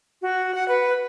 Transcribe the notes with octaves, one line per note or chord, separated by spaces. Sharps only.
F#4
F#5
B4